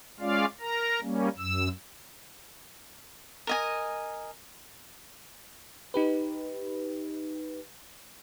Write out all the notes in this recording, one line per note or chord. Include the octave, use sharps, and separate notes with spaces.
G#3 C#4 F4 D5 F5
A#4 A#5
G3 A#3 C#4
F#2 E6
A#4 D#5 G#5
D#4 G4 B4